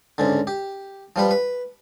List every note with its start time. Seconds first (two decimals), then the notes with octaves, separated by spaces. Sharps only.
0.18 C#2 G#2 D3
0.47 G4
1.16 F3 G3 B4
1.31 B4